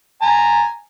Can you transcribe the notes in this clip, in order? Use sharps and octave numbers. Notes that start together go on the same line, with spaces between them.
G#5 A#5